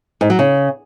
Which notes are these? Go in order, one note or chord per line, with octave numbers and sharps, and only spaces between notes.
G#2
F#3
C#3